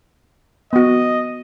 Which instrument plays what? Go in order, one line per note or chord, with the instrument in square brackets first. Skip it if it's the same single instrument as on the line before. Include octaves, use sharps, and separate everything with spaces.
[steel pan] B3 F#4 [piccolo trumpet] D#5